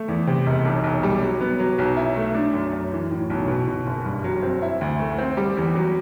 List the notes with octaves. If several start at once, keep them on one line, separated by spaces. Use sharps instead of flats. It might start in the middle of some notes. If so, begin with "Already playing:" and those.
Already playing: A3
E2
C3
E1
B1
B1
G3
F#3
B3
F#3
B1
E4
A3
D4
F#2
F#2
E3
A2
B1
B2
B2
F#1
G2
F#3
C4
E4
D2
A3
C4
G3
E2
F#3